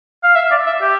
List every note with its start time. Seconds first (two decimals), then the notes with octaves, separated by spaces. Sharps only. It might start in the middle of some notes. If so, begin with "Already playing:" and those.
0.24 F5
0.35 E5
0.51 D5
0.66 E5
0.82 G4